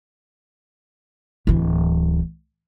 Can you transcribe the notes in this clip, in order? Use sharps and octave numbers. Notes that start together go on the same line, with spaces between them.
D1 E3